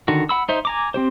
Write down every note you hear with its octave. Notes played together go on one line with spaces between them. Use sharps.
D3 D#3 F#4
F#5 B5 E6
D#4 C5 E5
G#5 A#5 D6
C4 G4 C5